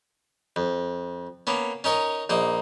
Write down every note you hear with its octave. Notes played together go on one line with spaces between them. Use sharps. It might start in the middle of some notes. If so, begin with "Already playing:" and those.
F2
A#3 B3 C#4
C#4 D#4 A#4 C#5
A#1 A#3 D#4